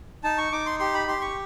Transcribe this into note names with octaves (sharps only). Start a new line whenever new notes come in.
D#4 A5
C#6
D#4 D6
C6
G4 C6
B5
G4 C6
C#6